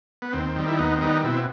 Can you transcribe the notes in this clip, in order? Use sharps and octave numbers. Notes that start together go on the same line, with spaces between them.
B3
D#2 C4
D#3 G3
E4
D#2 B3 D#4
C4
D#3 G3 B3 D#4
B2 C4 E4